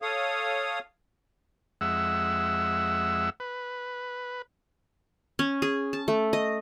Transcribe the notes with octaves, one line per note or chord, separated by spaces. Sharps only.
A4 C#5 F5 D#6
F2 G#3 E5 F#5 E6
B4
C#4
G#4
A5
A3
D#5